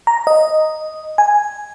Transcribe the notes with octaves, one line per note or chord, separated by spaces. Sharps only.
A#5
D#5
G#5